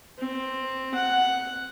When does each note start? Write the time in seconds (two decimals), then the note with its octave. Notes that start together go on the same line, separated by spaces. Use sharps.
0.19 C4
0.94 F#5